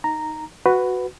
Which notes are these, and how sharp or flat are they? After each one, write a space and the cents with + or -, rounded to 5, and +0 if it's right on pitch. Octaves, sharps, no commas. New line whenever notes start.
D#4 +0 A#5 -5
F#4 +0 B4 +10